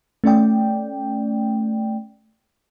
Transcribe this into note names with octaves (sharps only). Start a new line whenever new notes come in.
A3 C#4 D5 G5